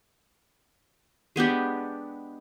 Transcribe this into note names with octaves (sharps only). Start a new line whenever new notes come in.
G#3 B3 D4 G4